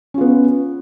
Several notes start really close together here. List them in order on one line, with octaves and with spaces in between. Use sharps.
C#4 F4 B3